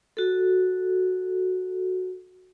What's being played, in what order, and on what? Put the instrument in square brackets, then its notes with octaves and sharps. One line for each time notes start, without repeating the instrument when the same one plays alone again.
[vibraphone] F#4 A4